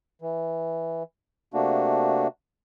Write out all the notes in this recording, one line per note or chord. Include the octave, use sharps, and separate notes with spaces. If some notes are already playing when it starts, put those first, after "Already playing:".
E3
C3 A3 A#3 D4 F#4